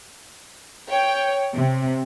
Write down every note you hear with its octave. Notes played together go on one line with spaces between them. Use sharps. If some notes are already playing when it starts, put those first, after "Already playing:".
C#5 G5
C3